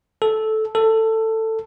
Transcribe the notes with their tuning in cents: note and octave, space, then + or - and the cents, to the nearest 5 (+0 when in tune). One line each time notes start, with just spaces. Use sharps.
A4 -10
A4 +15